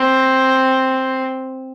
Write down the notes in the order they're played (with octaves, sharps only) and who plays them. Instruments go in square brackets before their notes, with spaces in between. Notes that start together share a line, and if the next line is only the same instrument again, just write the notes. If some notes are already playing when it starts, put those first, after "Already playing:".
Already playing: [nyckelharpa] C4